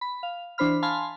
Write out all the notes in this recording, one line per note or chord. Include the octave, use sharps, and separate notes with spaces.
B5
F5
E3 D4 C5 B5 F6
F5 G#5 A5 B5 C6 F6